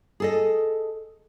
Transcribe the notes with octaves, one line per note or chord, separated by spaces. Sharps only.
G#4 A4 D#5